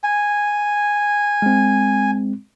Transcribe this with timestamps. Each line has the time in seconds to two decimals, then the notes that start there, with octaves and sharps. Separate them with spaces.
0.04 G#5
1.42 G#3 C4